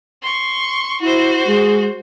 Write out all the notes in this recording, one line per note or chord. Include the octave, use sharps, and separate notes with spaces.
C6 C#6
E4 F#4 C5
G#3